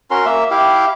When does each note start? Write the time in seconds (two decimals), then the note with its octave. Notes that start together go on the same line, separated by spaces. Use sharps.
0.11 C#4 F#4 A#4 C6
0.25 A#3 E5
0.51 E4 G4 F5